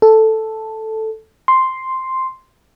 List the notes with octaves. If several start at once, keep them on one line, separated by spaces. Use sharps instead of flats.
A4
C6